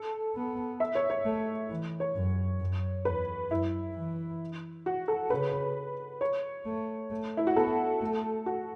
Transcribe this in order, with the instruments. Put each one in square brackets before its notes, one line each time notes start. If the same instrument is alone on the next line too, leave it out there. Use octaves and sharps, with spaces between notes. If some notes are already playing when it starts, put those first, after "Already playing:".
Already playing: [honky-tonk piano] A4
[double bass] B3
[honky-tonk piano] E5
C#5
C#5
[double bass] A3
E3
[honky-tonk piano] C#5
[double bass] F#2
F#2
[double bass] E2 [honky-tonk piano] B4
[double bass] F#2 [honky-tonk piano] E4
[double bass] E3
[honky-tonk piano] F#4
A4
[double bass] C#3 [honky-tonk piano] B4
[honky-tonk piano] C#5
[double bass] A3
A3
[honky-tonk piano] E4
F#4
[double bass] B3 [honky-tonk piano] A4
[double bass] A3
[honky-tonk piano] F#4